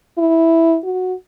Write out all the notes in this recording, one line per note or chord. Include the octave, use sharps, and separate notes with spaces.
E4
F#4